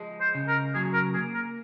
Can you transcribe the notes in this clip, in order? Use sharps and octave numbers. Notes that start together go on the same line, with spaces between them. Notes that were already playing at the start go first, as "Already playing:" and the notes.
Already playing: F3 G#3
C5
C#3
A#4
F#3 G#4
A#4
A#3 G#4
A#4